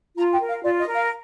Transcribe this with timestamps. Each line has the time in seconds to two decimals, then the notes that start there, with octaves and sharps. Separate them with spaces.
0.17 F4 A#5
0.32 G5
0.40 A#4
0.47 F5
0.63 F4 D5
0.78 D#5
0.87 A#4
0.95 F5